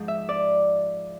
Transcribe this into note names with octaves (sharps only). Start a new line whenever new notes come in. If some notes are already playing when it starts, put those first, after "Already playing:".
Already playing: G#2 F3
E5
D5